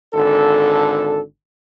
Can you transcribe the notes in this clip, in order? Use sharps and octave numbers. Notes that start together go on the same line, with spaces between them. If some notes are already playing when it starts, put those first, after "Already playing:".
G#1 D3 A4